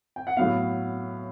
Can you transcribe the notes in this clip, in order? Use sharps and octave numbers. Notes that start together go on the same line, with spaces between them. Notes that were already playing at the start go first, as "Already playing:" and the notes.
G5
F#5
A2 F#3 B3 F5